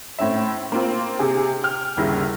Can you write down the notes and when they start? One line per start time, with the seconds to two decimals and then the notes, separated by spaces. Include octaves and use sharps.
0.19 A2 C4 C#4 E5
0.72 A#3 C4 F4
1.19 C3 G#4
1.63 G5 F6
1.97 G1 D#2 C#3 E4 A#6